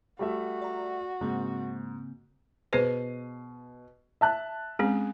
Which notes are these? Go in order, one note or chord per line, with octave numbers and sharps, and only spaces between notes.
G3 A3 F#4 E5
D5 A#5
G#2 C#3 A#3 C4
B2 G#4 B4 C5 C7 D#7
E5 A5 F#6
G#3 C4 C#4 G#4